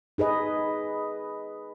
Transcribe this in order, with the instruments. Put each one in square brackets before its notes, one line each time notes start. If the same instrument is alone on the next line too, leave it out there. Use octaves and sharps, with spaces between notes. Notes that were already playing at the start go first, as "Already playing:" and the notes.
[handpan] D#4 G#4 B4 D#5